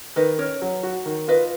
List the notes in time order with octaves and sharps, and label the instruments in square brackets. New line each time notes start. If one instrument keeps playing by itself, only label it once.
[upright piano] D#3 [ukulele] B4 D#5
[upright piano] C#4 [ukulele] A#4 C#5
[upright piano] F#3
F#4
D#3
[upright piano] F4 [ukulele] B4 D#5